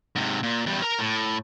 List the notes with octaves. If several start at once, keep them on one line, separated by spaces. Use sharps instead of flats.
G#2 C3
A#2
E2 G3
A#4 A#5
A2